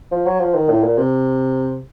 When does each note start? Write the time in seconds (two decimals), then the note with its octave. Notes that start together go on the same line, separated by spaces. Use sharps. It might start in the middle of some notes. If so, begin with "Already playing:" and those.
0.12 F3
0.26 F#3
0.40 F3
0.55 D#3
0.70 A2
0.83 A#2
0.98 C3